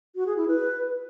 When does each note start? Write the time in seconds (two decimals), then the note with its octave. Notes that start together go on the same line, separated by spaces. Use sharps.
0.16 F#4
0.26 G#4
0.37 E4
0.48 B4